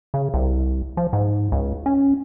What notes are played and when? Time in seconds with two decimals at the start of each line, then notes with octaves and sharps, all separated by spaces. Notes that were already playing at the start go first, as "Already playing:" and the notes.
0.14 C#3
0.34 C2
0.97 F3
1.13 G#2
1.52 C#2
1.86 C#4